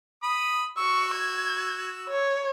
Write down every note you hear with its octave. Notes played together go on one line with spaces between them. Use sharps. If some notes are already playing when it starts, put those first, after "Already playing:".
B5 D#6
F#4 C#6 E6
G#6
C#5